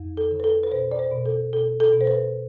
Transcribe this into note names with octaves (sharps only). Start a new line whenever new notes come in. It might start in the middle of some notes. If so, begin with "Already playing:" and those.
Already playing: F2
A4
D3
B4
A4
B4
B2 C5
D5
C5
B2
A4
B2 A4
A4
B2
C5
B4